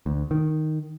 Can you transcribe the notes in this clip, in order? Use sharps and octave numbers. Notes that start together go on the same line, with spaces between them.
D2
D#3